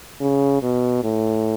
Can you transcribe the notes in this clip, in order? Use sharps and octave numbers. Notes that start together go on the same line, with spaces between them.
C#3
B2
A2